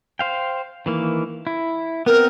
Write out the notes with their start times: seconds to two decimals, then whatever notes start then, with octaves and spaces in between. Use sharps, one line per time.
0.19 C5 F5 G5
0.86 D#3 E3 A#3
1.47 E4
2.06 B3 C4 A#4